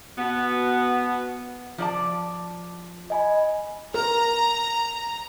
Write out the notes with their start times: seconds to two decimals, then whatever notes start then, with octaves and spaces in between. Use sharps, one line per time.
0.17 B2 B3
1.78 F3 D5 A5
3.10 D#5 G#5 B5
3.94 A#4 A#5